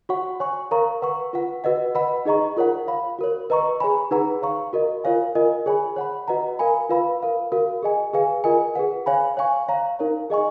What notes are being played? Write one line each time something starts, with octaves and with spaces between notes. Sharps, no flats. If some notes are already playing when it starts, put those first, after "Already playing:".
F#4 C#5 F#5 C#6
C#5 G#5 C#6
A#4 C#5 F5 A#5 C#6
B4 F#5 C#6
F4 B4 F#5
F#4 B4 D#5 F#5
B4 D#5 F#5 B5
D#4 G#4 D#5 A#5 C#6
F4 A#4 C#5 F#5
C#5 F5 B5
F#4 A#4 C#5
B4 D#5 A#5 C#6
G#4 C#5 G#5 B5
D#4 G#4 B4 F#5 A#5
C#5 F5 A#5 C#6
F#4 A#4 D#5
F4 A#4 C#5 F5 G#5
F4 A#4 D#5 G#5
G#4 C#5 G#5 B5
C#5 F#5 B5
F#4 B4 D#5 F#5 A#5
A#4 F5 G#5 B5
F4 B4 F5 B5
A#4 F5 B5
F#4 A#4 F5
G#4 D#5 G#5
G#4 B4 F5 G#5
F4 A#4 D#5 G#5
G#4 B4 F#5
C#5 F5 G#5 B5
C#5 F5 G#5 C#6
C#5 F5 A#5
D#4 A#4 C#5 F5
G#4 D#5 G#5 C#6